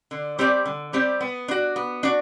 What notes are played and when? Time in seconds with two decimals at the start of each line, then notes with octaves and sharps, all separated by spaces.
0.11 D3
0.39 G3 C4 G4 D5
0.66 D3
0.93 G3 C4 G4 D5
1.21 B3
1.48 D4 F#4
1.76 B3
2.03 D4 F#4